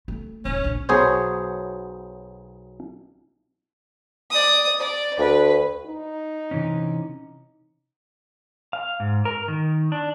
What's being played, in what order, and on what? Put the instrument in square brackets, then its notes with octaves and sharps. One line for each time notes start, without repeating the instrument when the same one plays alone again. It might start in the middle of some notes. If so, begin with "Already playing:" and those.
[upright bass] A3
[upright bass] D#1 [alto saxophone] C#4
[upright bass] A#1
[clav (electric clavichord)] B1 F#3 B3 G#4 C5 C#5
[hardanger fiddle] D5 D#6
D5
[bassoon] D2 [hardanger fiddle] B4
[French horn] D#4
[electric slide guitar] C3 E3 C#4
F5
G#2
A#4
D#3
D4